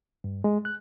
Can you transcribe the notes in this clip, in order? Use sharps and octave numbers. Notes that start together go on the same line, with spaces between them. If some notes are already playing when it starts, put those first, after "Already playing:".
G2
G#3
F#6